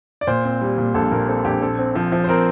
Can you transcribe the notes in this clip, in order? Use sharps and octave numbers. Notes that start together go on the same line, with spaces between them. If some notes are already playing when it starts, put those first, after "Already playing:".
D5
A#2 C5
C4
G3
A#2
A#1 A4
A#2 A#4
C4 A4
A#1 G4
C4 A4
C4
F3
F3
C5
C4 A#4